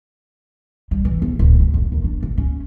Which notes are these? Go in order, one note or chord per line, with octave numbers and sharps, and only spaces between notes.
G3
E3
E2
D1
C#2
F2
D#2
D4
D1
C#4